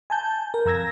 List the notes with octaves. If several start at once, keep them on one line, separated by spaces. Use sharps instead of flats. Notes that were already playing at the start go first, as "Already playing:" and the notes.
G#5 A5 G6
A#4
F2 A#5 E6 G#6 A#6